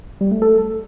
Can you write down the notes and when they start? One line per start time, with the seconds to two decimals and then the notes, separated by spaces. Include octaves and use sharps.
0.21 G3
0.31 A3
0.42 A4